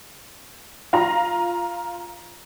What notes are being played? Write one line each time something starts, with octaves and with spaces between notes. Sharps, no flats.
F4 A#5